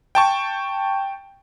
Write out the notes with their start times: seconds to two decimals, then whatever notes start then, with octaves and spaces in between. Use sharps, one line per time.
0.15 G5 A5 C#6